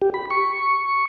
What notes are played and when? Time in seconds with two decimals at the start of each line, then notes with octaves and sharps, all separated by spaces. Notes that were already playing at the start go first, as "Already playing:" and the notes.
0.02 G4
0.14 B5
0.30 C#6